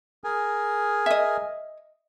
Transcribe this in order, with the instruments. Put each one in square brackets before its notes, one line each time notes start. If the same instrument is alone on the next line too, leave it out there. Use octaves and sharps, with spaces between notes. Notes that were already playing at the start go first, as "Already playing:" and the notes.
[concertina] G#4 A#4 G#5
[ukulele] D#5 E5